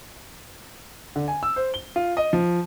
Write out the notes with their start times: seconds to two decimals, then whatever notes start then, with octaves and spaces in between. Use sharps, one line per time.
1.16 D3
1.28 G#5
1.43 E6
1.56 C5
1.74 G7
1.96 F4
2.17 D#5
2.33 F3